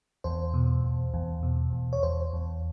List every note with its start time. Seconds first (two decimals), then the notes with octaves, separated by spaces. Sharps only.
0.24 E2 C5
0.54 B2
0.84 E2
1.14 E2
1.43 B2
1.73 E2
1.93 C#5
2.03 E2 C5
2.33 E2